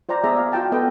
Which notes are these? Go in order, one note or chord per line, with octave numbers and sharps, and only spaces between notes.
F4 C5 D5 A#5
B3 G#4 D5 E5 A#5
F5
F4 F#4 G5 A5
B3 A4 B4 D#5 G5